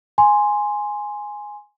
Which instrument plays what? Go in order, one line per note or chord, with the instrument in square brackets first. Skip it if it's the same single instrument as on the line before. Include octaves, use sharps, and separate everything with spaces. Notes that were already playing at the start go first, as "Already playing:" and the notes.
[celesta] G#5 C6